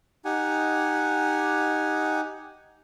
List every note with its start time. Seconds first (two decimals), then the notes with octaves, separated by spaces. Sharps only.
0.25 D#4 G4 F#5 G#5